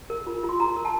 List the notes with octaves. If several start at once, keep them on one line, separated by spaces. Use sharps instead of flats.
A#4
F4
F4
C6
F4 A#5
A#4
A5